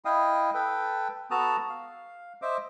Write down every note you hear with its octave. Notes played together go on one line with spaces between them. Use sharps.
E4 D#5 F5 G5 D#6
A4 B4 G5
B3 F#4 A4 A5 A#5 D#6
F5
C5 D#5 E5 D6